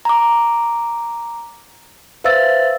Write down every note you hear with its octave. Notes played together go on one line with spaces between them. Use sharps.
A#5 D6
B4 C5 E5 F5 E6 A6